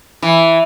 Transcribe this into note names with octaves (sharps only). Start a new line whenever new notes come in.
E3